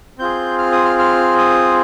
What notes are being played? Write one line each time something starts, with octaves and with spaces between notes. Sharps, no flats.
C4 F4 G#4 G6
F6
D#6
F6
F6
D#6